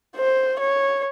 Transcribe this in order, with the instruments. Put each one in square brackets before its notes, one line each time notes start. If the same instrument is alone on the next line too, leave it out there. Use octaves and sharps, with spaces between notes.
[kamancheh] C5
C#5